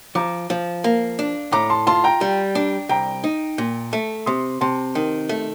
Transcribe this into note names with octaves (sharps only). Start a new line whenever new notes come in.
F3 A#5 D6
F3
A#3
D4
A2 A#5 D6
A5 C6
F4 A5 C6
G5 A#5
G3
D4
C2 G5 A#5
D#4
A#2
A3
C3 C6 D#6
C3 A5 C6
D#3
A3